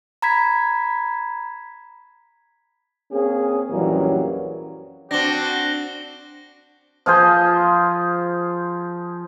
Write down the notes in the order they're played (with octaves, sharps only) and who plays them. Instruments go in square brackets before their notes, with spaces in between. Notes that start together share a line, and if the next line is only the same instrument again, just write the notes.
[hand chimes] A#5 B5 G#6 B6
[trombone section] A#3 C4 C#4 G#4
A#1 F#2 E3 F#3 G3 A#3
[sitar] C4 D4 [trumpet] F#4 [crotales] A#6 G7
[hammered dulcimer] F3 F4 G#4 C5